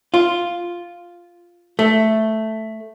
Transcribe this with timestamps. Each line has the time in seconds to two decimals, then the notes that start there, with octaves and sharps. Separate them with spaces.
0.14 F4
1.79 A3